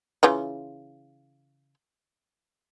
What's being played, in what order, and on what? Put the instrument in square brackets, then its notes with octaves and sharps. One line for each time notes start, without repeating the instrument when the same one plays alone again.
[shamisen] C#3 E3 F4